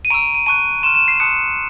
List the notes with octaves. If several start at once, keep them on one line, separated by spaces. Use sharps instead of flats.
D#7
A#5 C#6 E6 D7
D#7
A5 C#6 F#6 D#7
C6 F6 E7
E7
C7
A5 C6 D#6 F#6 C#7